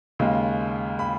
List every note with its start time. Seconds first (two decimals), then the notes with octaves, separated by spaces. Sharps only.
0.19 D#2 C#3 G#3
0.99 B5